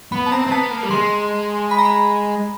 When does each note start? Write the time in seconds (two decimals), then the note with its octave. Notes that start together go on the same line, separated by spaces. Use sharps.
0.12 B3 B5
0.26 A5
0.31 C4 A#5
0.47 C4
0.51 B3 A5
0.71 A#3
0.83 G3
0.91 G#3 C6
1.71 B5
1.79 A#5
1.85 B5